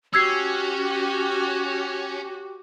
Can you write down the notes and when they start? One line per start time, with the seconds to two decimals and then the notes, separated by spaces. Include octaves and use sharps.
0.14 C#4 F#4 G4 E6 G#6 C7